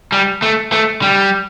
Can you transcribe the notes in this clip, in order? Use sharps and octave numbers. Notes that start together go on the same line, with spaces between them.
G3
A3
A3
G3